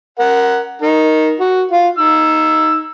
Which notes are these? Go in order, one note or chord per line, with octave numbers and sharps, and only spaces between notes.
A#4 F#5
D#4 A#4
F#4
F4
D#4 E6